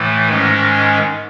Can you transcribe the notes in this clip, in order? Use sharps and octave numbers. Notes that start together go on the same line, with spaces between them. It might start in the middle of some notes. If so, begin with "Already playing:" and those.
Already playing: A2 E3 A3
G#2 D#3 G#3 C#4